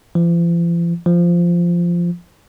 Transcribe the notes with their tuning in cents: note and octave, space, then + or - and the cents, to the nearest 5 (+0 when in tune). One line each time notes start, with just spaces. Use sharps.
F3 -45
F3 -10